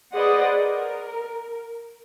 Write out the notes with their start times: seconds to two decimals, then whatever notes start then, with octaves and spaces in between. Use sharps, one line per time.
0.14 G#4 B4 C5 D5 D#5 F#5
0.55 A#4